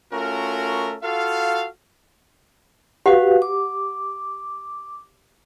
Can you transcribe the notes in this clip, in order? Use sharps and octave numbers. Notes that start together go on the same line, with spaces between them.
A3 C#4 F4 F#4 A#4
F4 F#4 A4 F5
F#4 G4 B4 F5 F#5
D6